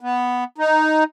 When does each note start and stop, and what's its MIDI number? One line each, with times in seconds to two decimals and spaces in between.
0.01 0.44 59
0.58 1.04 63